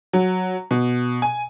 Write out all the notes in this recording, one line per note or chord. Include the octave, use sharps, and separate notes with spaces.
F#3
B2
G#5